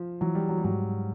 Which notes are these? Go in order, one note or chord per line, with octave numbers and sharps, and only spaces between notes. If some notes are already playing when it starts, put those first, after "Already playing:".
Already playing: F3
E3 F#3
G3
F#3
G3
G#2 F#3